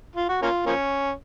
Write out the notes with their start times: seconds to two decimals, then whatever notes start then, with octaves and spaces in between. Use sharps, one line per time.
0.15 F4
0.28 F#4
0.42 A#3 C#4 F4
0.66 F3 A#3 C#4